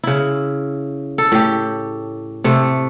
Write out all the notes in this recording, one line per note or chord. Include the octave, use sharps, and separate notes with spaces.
C#3 E4
A4
A2 G4
C3 A3